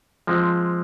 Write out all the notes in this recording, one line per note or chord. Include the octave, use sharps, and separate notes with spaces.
F3 G#3 C4